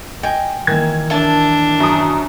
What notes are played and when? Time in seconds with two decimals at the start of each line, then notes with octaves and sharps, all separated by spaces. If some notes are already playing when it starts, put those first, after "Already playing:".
0.23 D#5 G5 G#5
0.67 D#3 E3 A#3 G#6
1.10 D4 E5 A5
1.80 F#2 D#6